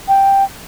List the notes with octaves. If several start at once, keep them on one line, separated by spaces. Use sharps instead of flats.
G5